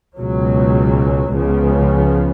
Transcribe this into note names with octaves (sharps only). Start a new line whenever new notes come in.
C#2 B2 F#3
C#2 C#3 F3 B3